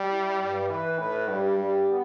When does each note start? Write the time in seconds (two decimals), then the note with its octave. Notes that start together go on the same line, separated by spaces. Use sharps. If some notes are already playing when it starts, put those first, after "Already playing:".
Already playing: G3
0.11 E4
0.40 G2
0.69 E3 B4
0.99 A2 B4
1.28 G2 G3
1.59 G3
1.88 B3